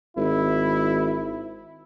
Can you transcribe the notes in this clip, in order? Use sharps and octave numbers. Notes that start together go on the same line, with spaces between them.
G#1 E4